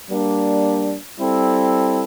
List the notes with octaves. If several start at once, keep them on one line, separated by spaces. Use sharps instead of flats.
G3 A#3 D4
G3 C4 E4 A4